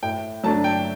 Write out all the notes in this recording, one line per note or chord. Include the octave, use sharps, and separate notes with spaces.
A2 G5
F#3 A3 D4 A5
G5